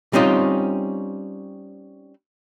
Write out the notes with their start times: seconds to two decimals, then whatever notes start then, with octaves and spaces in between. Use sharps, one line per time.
0.13 G3 C4 C#4 D#4 F4